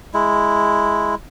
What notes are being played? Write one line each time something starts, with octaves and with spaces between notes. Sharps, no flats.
G#3 E4